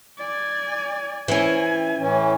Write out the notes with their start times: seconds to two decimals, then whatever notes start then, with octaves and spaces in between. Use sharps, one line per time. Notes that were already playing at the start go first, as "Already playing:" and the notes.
0.18 D5 G#5
1.28 E3 C#4 G#5
1.97 A2 E3 C#4